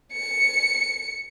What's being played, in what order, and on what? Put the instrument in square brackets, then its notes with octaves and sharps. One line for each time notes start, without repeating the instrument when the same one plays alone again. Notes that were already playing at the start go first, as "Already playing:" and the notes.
[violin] C#7